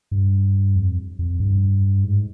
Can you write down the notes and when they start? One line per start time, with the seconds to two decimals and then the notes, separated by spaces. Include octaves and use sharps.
0.11 G2
0.76 F2
1.19 F2
1.40 G2
2.04 G#2